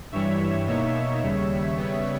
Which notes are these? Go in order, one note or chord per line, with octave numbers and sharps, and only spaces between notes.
G2 E3 G3 C#5 E5
B2 A#3 D#4 C#5 E5
D#2 C#3 G3
C#3 G3 B3